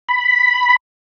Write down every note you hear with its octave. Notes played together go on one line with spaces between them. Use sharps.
B5